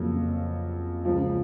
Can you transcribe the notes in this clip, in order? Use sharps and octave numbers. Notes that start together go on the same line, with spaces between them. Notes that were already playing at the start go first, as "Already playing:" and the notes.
Already playing: F2 C#3 F#3 A#3
C#2 C#3 F3